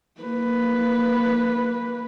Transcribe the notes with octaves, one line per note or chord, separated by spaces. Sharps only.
A#3 B4